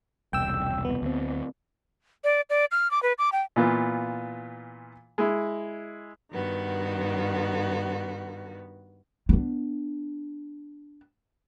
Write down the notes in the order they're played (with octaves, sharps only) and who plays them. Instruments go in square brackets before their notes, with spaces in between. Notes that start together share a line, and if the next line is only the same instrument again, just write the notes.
[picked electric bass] E1 C2 [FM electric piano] G5 E6
[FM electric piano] B3
[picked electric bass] D2 C4
[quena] D5
D5
F6
D6
B4
D6
G5
[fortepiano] A#2 E3 B3 F4
G#3 E4
[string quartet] G2 D#3 B3 F#4
[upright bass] B3 D4